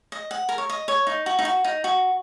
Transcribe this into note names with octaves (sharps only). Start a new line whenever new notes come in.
D#5
F#5
A#4
C#5
D#5
C#5
D#4
F#4
D#4
F#4
D#4
F#4